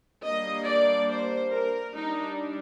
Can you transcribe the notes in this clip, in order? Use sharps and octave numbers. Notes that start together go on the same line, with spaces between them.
G3 A#3 D4 D#5
D5
C5
A#4
G3 D4 D#4